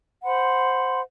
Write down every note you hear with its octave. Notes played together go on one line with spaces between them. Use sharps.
C5 F#5 B5 C6